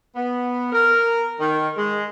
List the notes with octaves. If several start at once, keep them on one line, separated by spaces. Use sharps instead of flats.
B3
A#4
D#3
G#3